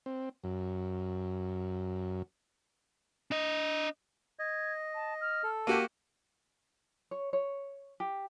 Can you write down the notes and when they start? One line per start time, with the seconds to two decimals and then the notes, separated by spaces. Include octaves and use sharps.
0.06 C4
0.44 F#2
3.31 D4 D#5
4.39 D#5 G#6
4.95 A5
5.21 F6
5.43 A4
5.67 A#3 F#4 G4 D#7
7.11 C#5
7.33 C#5
8.00 G4